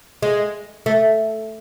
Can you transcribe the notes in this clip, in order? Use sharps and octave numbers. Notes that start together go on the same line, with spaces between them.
G#3
A3